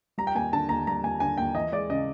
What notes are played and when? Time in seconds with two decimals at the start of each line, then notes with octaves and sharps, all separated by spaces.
0.18 G3 A#5
0.27 G5
0.35 D#2 G#5
0.53 D3 A5
0.69 D#2 A#5
0.87 G3 A#5
1.03 D#2 G#5
1.20 D3 G#5
1.37 D#2 G5
1.55 E3 D#5
1.72 G#3 D5
1.90 C#3 D#5